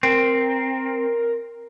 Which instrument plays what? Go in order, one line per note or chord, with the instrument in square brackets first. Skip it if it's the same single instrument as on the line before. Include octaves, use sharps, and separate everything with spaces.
[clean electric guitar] C4 [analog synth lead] A#4